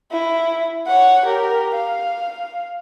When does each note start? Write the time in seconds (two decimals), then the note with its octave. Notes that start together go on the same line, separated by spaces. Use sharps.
0.11 E4
0.87 C#5 F#5
1.26 G4 A#4
1.75 F5